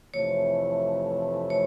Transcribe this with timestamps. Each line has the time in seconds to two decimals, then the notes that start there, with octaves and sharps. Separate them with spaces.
0.14 F2 C3 E3 A3 C#5
1.50 C#5